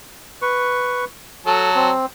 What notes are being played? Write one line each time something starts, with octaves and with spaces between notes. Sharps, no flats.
B4 C#6
F#3 A4 A5
C4